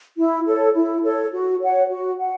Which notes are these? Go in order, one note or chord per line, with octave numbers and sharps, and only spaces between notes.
E4
A4 C#5
E4
A4 C#5
F#4
C#5 F#5
F#4
F#5